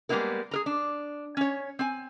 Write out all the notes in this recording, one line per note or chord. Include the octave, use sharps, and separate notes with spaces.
G3 G#3 A#3 B3 E4 A#4
G#4 A#4 A#5
D4
C#4 C#5
C4 G#5